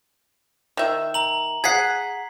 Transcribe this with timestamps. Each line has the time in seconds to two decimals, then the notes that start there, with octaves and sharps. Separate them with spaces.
0.77 D#3 E5
1.14 A#5 F#7
1.64 G#4 F#5 G#6 B6 C7